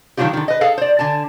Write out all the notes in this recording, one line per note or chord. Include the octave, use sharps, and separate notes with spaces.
D#3 F3 F#3 C#4 F4 G4
D3 D#3
B4 D#5
G#4 A4 F5
C5 D5
D3 G#5 A5